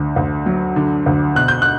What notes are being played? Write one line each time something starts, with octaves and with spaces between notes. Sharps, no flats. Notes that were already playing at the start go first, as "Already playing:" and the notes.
Already playing: D2 D3
D2
F#3
D3
D2
B2 F#6
G6
F#6